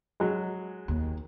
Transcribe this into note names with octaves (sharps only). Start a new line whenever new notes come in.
F#3 G#3
D#2